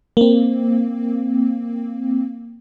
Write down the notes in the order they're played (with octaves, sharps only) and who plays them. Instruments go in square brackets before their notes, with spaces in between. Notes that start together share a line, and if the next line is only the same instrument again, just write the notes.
[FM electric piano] A#3 C4